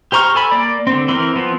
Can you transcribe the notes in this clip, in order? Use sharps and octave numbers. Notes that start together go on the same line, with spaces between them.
G4 C5 A#5 C#6 F6
A4 G#5 B5
A#3 D5
D3 C4
E3 C4 A#4
F3 B3 C4